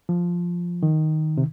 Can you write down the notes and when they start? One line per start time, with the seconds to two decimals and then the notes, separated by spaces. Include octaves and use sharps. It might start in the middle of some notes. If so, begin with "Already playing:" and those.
0.09 F3
0.83 D#3
1.38 C3